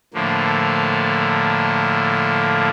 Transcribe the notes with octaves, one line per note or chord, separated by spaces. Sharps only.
A2 D3 F3 A#3